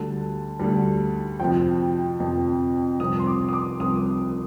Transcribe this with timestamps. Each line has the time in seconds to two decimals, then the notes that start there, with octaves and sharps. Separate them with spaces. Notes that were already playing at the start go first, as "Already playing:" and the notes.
Already playing: D2 D3 G3 A5
0.59 D2 D3 G3
1.40 F2 C3 F3 G5
2.20 F2 C3 F3
3.00 C2 C3 F3 D#6
3.20 C6
3.27 D6
3.49 D#6
3.53 D6
3.80 C2 C3 F3 D#6